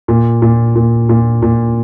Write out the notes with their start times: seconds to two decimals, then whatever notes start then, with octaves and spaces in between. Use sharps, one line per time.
0.08 A#2
0.42 A#2
0.75 A#2
1.09 A#2
1.42 A#2